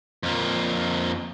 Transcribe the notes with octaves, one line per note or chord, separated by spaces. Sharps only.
F2 A#3